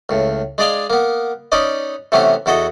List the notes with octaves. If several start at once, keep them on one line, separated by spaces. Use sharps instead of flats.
C#2 A2
G#3 D4 D5 D#5 F5 G#5
A#3 B3
C#4 D#4 B4 D5 D#5
C3 E3 A3 B3 C#4
E2 E4 F#4 A4 D#5